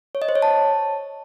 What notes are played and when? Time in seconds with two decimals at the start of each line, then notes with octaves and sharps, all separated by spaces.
0.15 C#5
0.22 D#5
0.29 C5
0.35 C#5
0.42 A5